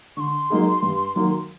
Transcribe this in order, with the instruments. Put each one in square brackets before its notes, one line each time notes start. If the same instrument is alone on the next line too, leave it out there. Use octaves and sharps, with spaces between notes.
[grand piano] D3 [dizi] C#6
[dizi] C6
[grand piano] F#3 A#3 D#4 G#4
G2
D#3 F#3 A#3